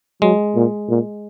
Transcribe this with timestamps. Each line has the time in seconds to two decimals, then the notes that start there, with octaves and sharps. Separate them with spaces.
0.22 F#3 G#3
0.55 A#2
0.89 A#2